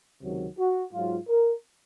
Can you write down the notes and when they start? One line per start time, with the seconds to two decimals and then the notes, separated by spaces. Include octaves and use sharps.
0.22 C#2 C3 D#3 F#3
0.58 F#4
0.92 G#2 F#3 F4
1.28 A#4